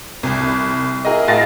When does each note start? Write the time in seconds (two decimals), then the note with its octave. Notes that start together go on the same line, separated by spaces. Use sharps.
0.23 C2
1.05 E4 G#4 A#4 D#5
1.27 A2 F5 A5 A6 A#6